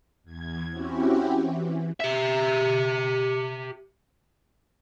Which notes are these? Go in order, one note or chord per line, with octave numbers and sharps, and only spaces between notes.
E2 G#6
C4 C#4 E4 F#4 G4
E3
G4 E5